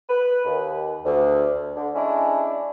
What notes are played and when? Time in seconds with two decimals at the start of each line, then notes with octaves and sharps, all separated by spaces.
0.09 B4
0.45 D#2
1.05 D2
1.75 D3
1.94 G#3 C#4 D4 E4